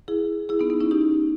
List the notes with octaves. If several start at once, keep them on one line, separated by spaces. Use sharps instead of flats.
E4 G#4
E4 G#4
B3 D#4
B3 D#4
C#4 E4
D#4 G4